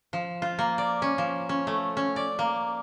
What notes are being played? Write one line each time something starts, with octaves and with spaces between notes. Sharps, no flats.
F3
F4
A#3
D5
C#4
F3
C#4
A3
C#4
D5
A#3